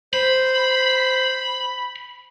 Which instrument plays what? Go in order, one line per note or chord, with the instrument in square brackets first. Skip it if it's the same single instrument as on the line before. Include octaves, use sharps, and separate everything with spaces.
[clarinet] C5 [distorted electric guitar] B5